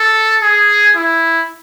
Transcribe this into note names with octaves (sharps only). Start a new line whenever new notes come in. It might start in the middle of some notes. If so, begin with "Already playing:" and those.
Already playing: A4
G#4
E4